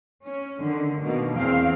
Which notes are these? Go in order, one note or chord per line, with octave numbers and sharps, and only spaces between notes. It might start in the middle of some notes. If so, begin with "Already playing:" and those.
C#4
D3 D#3
B2 D#3 A#3
E2 C4 G#4 F5